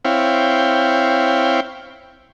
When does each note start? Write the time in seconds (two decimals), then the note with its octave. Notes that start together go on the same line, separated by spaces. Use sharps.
0.05 C4 E4 C#5 F5 G5